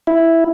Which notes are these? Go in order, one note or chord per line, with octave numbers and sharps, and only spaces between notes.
E4